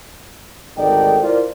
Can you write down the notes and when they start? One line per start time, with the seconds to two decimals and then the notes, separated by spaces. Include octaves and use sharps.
0.77 G#1 D2 D#4 A4 D5 G5
1.22 E4 F4 A#4 C5 D5